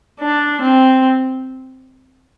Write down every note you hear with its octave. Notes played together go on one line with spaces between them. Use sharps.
D4
C4